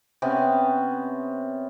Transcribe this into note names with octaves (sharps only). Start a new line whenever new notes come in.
C3 B3 C#4